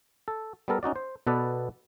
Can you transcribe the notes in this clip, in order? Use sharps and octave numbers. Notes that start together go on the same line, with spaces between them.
A4
G3 B3 A4 A#4
C#4 D#4 F#4 D5
C5
B2 B3 A4 B4 D5